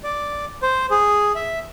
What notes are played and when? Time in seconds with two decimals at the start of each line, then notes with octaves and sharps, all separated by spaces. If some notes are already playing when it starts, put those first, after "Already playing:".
0.04 D5
0.62 C5
0.90 G#4
1.35 E5